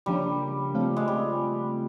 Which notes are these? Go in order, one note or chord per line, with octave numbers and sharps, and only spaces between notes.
C#3 F3 G3 A#3 D4
C#3 F3 A3 C4 F4
G#3
G3